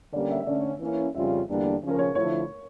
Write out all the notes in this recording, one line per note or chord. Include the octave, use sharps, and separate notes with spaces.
D3 G3 A#3 C#4 G4 D5
E5
E5
D3 A3 C#4 D5
E3 A#3 C#4 E4
F2 C#3 G3 C#4 F4 E5
E2 D3 G3 A#3 D4
C#3 F3 C#4
A#4
C#5
D3 F3 A3 E4 C#5